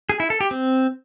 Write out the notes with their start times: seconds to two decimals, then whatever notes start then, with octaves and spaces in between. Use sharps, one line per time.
0.09 G#4
0.20 E4
0.30 A4
0.41 G4
0.51 C4